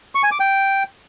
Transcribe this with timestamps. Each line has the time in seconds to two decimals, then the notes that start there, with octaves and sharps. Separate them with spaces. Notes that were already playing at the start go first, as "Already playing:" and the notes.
0.15 C#6
0.23 G#5
0.32 D6
0.40 G5